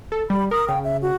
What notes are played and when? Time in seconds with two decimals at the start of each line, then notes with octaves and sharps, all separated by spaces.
0.12 A4
0.30 G3 B5
0.51 A#4 D#6
0.69 C#3 G5
0.84 E5
1.02 F#4